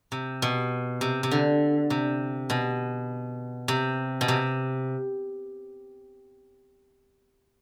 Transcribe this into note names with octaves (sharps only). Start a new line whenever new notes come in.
C3
B2
C3
C3
D3
C3
B2
C3
B2
C3